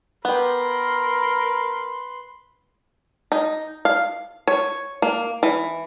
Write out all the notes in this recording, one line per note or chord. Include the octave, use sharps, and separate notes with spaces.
B3 G4 A#4 B4 C6
D#4
F5
C#5
A#3
E3